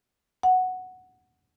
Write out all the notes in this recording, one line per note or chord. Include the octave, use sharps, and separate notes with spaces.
F#5